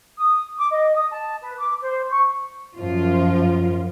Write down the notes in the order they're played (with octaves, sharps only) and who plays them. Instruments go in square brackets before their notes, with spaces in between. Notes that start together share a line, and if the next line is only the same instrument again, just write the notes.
[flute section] D#6
D6
D#5
D#6
A5
B4
D6
C5
C#6
[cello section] F#2 F3 F4